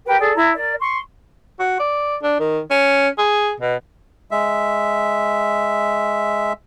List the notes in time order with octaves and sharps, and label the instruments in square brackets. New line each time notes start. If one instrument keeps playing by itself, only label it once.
[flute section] G4 A#4 B4 G5
G#4 A4 D5
E4 A#5
A#4 D5
C6 C#6
[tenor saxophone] F#4
D5
D4
D#3
C#4
G#4
B2
[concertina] G#3 E5